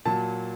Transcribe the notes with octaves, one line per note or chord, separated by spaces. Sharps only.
A#2 F#3 A5